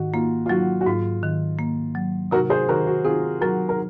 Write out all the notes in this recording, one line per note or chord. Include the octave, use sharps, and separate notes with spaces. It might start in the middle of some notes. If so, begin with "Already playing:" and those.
Already playing: G#2 D#3 F#4
A#3 F4
F4
F#3 F#4
F#4
G#2 F4
D#3
A#3
F#3
C3 F#4 A#4
G#4 C5
D#3 F#4 A#4
F#4
C4 F4 G#4
F#3 F#4 A#4
A#4